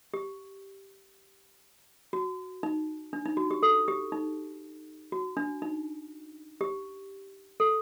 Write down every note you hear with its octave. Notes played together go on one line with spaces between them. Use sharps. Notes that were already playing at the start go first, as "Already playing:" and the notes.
G4
F#4
D#4
D4
D#4
F#4
G4
A4
G4
D#4
F#4
D4
D#4
G4
A4